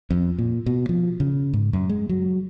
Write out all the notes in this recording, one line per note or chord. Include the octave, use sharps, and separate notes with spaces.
F2
A#2
B2
F3
C#3
G#2
F#2
G#3
F#3